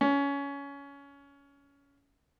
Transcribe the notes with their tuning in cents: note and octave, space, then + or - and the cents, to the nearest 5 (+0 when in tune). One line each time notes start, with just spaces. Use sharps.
C#4 +20